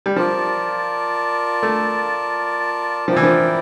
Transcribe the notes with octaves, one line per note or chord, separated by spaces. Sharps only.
G3
F3 F4 A#4 D5 A5
A3
F3 E4 A#4 D5 G5
E3
F3